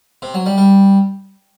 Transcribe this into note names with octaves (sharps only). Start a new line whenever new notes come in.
C3
F#3
G3
G3